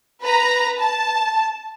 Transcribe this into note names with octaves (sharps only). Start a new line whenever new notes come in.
B4 A#5
A5